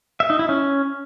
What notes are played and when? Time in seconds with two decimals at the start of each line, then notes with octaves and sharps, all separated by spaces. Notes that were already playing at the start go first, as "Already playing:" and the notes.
0.20 E5
0.30 D#4
0.39 E4
0.49 C#4